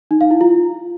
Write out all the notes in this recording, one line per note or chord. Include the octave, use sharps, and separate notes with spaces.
D#4
F5
E4
F4